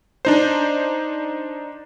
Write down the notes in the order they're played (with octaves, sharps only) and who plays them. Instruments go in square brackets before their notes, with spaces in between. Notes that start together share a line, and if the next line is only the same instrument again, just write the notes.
[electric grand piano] D4 D#4 C5